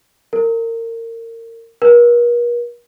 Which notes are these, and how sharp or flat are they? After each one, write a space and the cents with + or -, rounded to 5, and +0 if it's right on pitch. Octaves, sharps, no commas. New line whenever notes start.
A#4 -30
A#4 +45